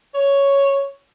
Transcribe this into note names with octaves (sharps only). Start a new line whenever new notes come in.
C#5